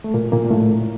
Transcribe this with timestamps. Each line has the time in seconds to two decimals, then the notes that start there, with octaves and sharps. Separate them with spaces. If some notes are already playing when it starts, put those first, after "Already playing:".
0.04 A3
0.14 A#2 A#3
0.32 A#2 A#3
0.51 A2 A3